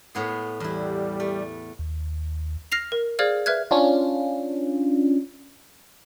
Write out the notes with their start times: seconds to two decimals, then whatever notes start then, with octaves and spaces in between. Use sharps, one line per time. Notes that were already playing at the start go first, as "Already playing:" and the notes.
0.15 A2 B3 G#4
0.60 E2 G3 E4
1.20 A3
1.79 D#2
2.72 F6 A#6 C7 F7
2.92 A#4
3.19 G#4 C5 D5 F5 F6 G#6
3.46 B4 E5 F6 F#6 G#6
3.71 C#4 D4 F4